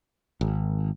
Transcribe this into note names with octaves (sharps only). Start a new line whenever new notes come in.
G#1